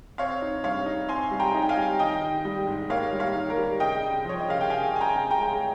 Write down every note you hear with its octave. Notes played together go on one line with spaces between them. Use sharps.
C4 C#5 F5
D#4
G2 C#5 F5
D#4
C4 G#5 C6
G3
G5 A#5
D#4
G5
F5 G#5
G3
D#3 D#5 G5
D#3
G3
G#2
A#3 C#5 F5
G3
C#5 F5
D#3
A#4
G3
C#3 D#5 G5
C#3
F3 C#5
D#5
C#3 F5
G5
C#3 F5 G#5
C#3 G#5
G5 A#5
C#3
G5 A#5
G#3